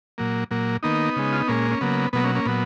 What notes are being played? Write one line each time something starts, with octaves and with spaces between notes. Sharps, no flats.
A#2 F#3 A#3
A#2 F#3 A#3
D#3 A#3 B3 D#4
C#3 G#3
F4
D#4
A#2 G#3 A#3 C#4
C#4
C#3 F#3 A#3 B3
B2 F#3 A#3 B3
A#3 C#4
A#3 C#4
A#2 F#3 B3